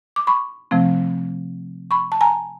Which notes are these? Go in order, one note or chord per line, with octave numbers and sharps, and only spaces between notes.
D6
B5 C#6
C3 F3 A3 C4
B5 C#6
A5
G#5 A#5